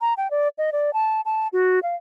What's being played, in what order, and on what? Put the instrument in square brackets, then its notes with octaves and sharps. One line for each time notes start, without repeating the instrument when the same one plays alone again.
[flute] A#5
G5
D5
D#5
D5
A5
A5
F#4
F5